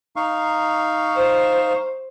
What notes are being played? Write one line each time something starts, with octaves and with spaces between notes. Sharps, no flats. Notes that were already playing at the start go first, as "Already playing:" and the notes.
D#4 F5 C#6
C5